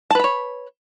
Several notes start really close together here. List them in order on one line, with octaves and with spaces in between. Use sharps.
A5 B4 B5 C#5